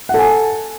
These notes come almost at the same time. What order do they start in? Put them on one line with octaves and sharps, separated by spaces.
F#5 A4 G#5